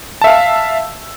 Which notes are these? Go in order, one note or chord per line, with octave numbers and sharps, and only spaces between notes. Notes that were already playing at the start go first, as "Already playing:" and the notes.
E5 F5 A5 E6